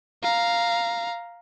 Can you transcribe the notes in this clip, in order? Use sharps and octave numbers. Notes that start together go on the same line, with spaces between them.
F5 A#5